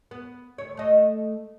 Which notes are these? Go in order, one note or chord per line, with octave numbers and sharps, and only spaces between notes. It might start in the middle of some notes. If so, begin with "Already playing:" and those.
B3
D2 C#5
A3 D#5